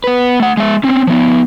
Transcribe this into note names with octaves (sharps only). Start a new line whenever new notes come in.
B3 B4
A3 F#5
G#3 E5
C4 C#4
F3 B3